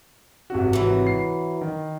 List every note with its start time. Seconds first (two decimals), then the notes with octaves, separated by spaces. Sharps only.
0.50 G#1 C3 F#4
0.73 E3 F#3
1.07 C7
1.61 D#3